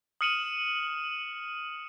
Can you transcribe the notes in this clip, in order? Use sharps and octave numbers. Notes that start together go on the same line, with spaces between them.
D#6 F6 C#7 D#7 E7 F#7